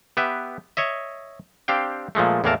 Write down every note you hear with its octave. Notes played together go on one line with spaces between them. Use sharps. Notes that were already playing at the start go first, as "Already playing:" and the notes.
B3 G4 B4 E5
C#5 D#5 E5
C4 D4 G4 F5 G5
A#2 F3 G#3 A3
E2 A2 E3 A#3 A#4 A5